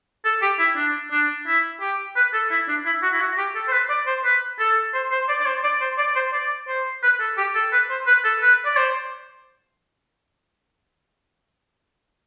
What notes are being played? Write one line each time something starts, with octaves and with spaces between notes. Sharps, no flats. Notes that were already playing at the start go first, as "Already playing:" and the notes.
A4
G4
E4
D4
D4
E4
G4
B4
A4
E4
D4
E4
F#4
E4
F#4
G4
A4
C5
B4
D5
C5
B4
A4
C5
C5
D5
D5
C5
D5
C5
D5
C5
D5
C5
B4
A4
G4
A4
B4
C5
B4
A4
B4
D5
C5